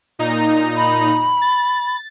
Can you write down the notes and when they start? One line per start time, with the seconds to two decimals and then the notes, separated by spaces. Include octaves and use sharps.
0.19 A#2 D#4 A#5
0.77 B5
1.42 A6